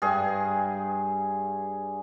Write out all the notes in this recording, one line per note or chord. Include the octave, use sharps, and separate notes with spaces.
G2 G#4